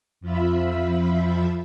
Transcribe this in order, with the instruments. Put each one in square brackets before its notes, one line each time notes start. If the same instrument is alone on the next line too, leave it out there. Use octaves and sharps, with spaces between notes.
[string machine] F2 F3 F4 E5 B5